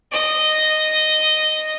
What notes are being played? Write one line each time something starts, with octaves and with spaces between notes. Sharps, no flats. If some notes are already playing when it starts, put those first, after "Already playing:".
D#5